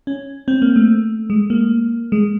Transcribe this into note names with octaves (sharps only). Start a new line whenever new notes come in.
C#4
C4
A#3
A3
G#3
A#3
G#3